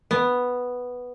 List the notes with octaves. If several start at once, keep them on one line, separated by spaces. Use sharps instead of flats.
B3